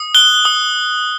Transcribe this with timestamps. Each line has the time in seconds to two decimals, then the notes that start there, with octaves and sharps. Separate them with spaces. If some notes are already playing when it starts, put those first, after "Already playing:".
Already playing: D#6
0.15 F#6 G7
0.45 D#6